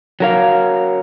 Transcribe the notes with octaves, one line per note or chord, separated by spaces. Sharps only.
F#3 A#4 F5